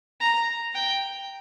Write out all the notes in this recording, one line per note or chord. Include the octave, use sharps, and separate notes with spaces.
A#5
G5